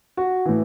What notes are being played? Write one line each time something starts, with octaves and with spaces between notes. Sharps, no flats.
F#4
A2 E3